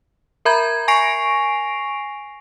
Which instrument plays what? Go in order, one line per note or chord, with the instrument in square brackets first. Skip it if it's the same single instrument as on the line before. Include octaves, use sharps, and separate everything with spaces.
[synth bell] A#4 E5 A#5 B5 G6 G#6
G#5 C#6 A#6 C7 D7 F7